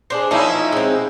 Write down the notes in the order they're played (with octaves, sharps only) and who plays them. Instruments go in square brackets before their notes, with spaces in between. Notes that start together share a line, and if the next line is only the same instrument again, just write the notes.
[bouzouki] G#3 D4 C5
[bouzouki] F3 A#3 C#4 [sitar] D#4 E4
[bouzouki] G#3 C4